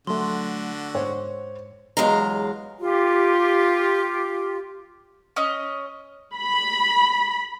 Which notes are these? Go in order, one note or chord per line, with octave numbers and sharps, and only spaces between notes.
D3 F#3 A3 F#4 C6
G#2 C5 C#5
E2 F#3 G#3 F5 A#5
F4 G4
C#4 D#5
B5